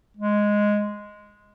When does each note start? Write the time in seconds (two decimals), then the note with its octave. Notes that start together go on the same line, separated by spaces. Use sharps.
0.17 G#3